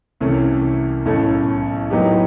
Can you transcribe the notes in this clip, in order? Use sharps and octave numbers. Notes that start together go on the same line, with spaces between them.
C2 C3 E3 A3 C#4
B1 A2 E3 A3 C#4
A2 F#3 B3 D#4 G4